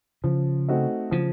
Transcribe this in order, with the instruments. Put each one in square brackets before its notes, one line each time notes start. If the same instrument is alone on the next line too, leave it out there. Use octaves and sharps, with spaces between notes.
[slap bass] C#3 [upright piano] F3
[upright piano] A3 C4 D#4 F#4
[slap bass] C#3 [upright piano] F3